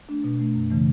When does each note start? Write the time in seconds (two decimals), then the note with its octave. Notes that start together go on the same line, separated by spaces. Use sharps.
0.09 A3 D4
0.24 B2
0.39 A3 D4
0.55 F#2
0.70 C#3 E3 A3